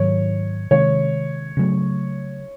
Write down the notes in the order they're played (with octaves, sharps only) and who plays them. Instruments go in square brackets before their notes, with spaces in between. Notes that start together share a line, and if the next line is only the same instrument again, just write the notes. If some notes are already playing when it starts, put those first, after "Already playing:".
Already playing: [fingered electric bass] G#2 D#3 F#3 [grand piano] C#5
[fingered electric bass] C3 D#3 G#3 [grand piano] C#5
[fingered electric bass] C#3 F#3 A3